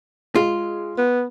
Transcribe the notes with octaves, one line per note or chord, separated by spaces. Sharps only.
G#3 F4
B3